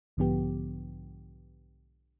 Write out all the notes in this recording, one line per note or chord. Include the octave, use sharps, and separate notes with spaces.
B1 G#2 D3 F3 B3 G4